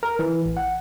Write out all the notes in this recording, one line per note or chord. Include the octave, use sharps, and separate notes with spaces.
A#4
E3
A1
F#5